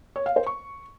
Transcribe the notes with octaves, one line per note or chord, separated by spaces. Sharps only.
C#5
F5
C5
C#6